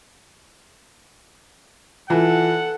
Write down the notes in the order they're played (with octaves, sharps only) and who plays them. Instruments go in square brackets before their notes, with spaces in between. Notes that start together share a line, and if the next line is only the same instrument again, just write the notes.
[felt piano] E3 [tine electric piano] F4 [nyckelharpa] A4 [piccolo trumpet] F#5